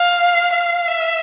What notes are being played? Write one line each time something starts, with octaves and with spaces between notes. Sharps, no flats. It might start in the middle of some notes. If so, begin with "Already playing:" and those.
Already playing: F5
F5
E5